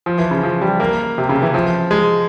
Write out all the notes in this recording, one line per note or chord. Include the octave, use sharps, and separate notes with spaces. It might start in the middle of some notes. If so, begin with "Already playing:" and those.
F3
E3
C#3
F3
G3
A#3
C3
C#3
E3
F3
G#3